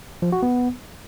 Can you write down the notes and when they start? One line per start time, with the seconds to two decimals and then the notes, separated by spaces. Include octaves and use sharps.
0.22 F3
0.32 F#4
0.43 B3